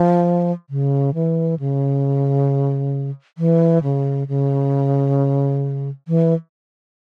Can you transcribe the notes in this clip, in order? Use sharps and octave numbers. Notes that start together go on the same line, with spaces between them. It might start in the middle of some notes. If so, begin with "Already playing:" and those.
Already playing: F3
C#3
E3
C#3
E3
C#3
C#3
E3